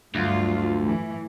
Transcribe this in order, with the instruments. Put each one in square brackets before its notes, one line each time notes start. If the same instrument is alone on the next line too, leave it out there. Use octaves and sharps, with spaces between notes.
[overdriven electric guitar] D2 [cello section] G2 F#3 F4
[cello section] A2 E3